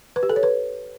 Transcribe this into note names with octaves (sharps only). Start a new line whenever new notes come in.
B4
G4
A4
C#5
B4